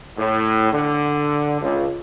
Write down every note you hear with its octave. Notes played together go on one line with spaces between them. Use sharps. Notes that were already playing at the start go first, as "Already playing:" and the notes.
A2
D3
C#2